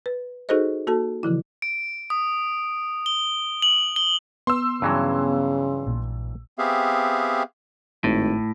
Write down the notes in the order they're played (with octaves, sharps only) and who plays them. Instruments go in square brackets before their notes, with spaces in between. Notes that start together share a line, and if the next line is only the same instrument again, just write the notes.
[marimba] B4
D#4 F#4 G#4 A4 C5 D#5
A#3 F#4 A4 A5
C#3 E3 F3 E4
[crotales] D7
D#6
G7
F#7
G7
[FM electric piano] B3 [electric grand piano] C6 E6
[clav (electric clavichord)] G2 E3 F#3 [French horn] C#3
[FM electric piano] A#1 A#2
[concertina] B3 C4 G4 G#4 E5 F5
[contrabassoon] G#1 [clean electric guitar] A2